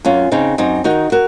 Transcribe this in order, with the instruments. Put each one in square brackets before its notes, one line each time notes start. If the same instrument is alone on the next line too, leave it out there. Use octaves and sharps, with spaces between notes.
[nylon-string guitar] F#2 C#4 F4
C#3 C4 D#4
F#2 C4 D#4
D#3 D#4 F#4
F#4 A#4